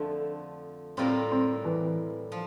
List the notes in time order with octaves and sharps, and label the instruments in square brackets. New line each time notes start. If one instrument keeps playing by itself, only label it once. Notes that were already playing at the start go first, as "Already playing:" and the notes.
Already playing: [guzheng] F2 D3 F3 A3
[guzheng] A2 G3 A#3 F4 A#4 [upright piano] C4
[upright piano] C4
E3
[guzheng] F3